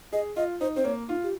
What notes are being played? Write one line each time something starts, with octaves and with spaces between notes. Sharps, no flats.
G#4 D#5
F4 D#5
D#4 C5
C4 C5
A#3 C#5
D#4 F4
G4